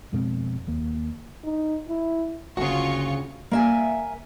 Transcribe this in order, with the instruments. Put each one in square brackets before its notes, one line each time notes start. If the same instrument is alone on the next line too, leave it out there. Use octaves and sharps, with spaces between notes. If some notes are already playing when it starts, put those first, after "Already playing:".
[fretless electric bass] F2 B2 G#3 C4
D#2 A#3
[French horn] D#4
E4
[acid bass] F#1 [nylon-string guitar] D2 C#3 [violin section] F4 C#6 [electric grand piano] F#4
[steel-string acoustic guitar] A#3 E5 G#5